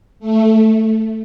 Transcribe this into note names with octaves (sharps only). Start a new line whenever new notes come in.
A3